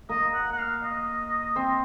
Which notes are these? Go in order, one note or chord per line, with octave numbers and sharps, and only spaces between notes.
A#3 A#4 D#5
F#5
F#5
F5
D#5
C4 C5